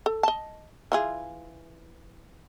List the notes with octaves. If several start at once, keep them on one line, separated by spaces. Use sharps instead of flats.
A4
D#5 A5
E3 F4 G#4